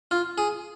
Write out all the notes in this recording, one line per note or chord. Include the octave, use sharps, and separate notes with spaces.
F4
G#4